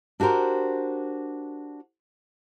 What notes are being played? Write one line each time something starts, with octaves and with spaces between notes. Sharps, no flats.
D4 F#4 G4 A#4 C5